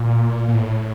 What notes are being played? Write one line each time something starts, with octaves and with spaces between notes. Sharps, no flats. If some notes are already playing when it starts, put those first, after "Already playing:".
Already playing: A#2
A#2
A2